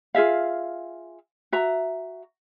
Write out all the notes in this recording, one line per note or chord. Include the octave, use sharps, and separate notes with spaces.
F4 G#4 E5 F5
F#4 E5 A#5